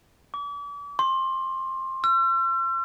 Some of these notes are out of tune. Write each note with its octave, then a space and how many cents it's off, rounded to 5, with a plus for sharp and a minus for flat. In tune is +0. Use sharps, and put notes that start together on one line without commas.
D6 -40
C6 +20
E6 +45